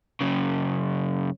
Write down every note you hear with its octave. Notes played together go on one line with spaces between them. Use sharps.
F#2 C#3